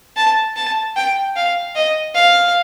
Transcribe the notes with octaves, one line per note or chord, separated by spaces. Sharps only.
A5
A5
G5
F5
D#5
F5